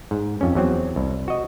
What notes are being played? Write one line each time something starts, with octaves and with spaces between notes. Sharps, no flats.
G#2
F2 C#4
E2 F#3 C4
C2
F#4 D#5